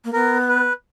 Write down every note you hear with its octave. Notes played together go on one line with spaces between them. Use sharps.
A#3
B3 A#4
B4